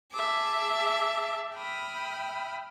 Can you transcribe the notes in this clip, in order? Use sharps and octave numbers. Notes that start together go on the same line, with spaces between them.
G#4 E5 A5 D6
E5 G5 B5 D#6 F6